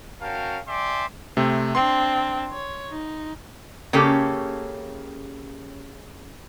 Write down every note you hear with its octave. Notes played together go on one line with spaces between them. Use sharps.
C#4 F#4 A#4 F5 G5 A5
D5 E5 G5 G#5 C6 D6
C3 A3 C4
C4 D4 C6
C#5
D#4
C#3 A#3 C#4 G4 A4